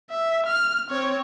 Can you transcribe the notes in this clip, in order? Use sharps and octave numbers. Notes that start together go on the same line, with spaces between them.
E5
F6
C4 C#5